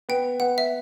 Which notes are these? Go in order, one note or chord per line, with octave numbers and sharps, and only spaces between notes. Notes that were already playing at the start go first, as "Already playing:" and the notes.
B3 G5
B3 F#5
E5